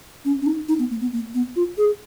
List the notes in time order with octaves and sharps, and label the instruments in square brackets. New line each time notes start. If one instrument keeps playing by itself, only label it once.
[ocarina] C#4
C#4
D#4
D#4
B3
A#3
B3
A#3
B3
F4
G#4